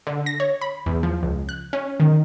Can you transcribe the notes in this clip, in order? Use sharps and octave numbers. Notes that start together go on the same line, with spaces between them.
D3
A#6
C#5
B5
E2
F3
C#2
F#6
C#4
D#3